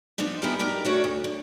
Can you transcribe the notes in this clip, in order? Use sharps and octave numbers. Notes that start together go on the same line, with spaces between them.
F3 B3 C4 D4 D#4
B3 E4 G4 G#4 A#4
D4 D#4 G4 A#4
A3 D4 F#4 A4 C#5 D5
D2
D3